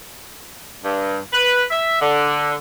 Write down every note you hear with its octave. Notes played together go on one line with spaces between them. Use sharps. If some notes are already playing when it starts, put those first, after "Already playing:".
G2
B4
E5
D3